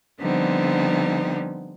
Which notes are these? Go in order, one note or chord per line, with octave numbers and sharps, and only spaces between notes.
D3 F3 G3 B3 C4 D#4